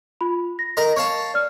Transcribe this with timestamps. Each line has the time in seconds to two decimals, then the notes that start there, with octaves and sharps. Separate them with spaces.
0.21 F4 B5
0.59 A#6
0.77 A#4 D#5 A#5
0.96 C#5 F5 A5
1.34 D5 F6